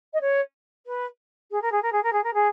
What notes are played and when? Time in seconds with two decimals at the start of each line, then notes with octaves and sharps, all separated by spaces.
0.13 D#5
0.21 C#5
0.86 B4
1.51 G#4
1.62 A#4
1.71 G#4
1.82 A#4
1.92 G#4
2.03 A#4
2.12 G#4
2.23 A#4
2.33 G#4